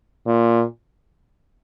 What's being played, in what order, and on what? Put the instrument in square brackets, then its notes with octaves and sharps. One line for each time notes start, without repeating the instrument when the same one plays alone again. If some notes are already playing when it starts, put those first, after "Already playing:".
[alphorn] A#2